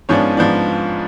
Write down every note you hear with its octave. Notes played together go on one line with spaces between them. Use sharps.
G#2 F3 B3 C#4 D4 C#5
G#2 F3 B3 D4